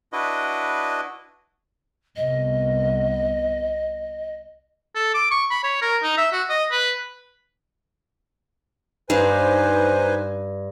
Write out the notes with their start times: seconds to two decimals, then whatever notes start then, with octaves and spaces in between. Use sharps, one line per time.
0.13 D4 E4 F#4 B4 D#5
2.16 C2 B3 D#5
4.95 A4
5.14 D6
5.31 C#6
5.50 B5
5.64 C#5
5.82 A#4
6.03 D#4
6.17 E5
6.32 F#4
6.49 D#5
6.71 B4
9.10 G2 D#4 B4 C5 G#5